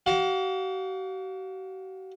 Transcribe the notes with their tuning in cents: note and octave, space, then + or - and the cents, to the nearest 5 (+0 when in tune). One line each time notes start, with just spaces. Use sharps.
F#4 +45 F5 +35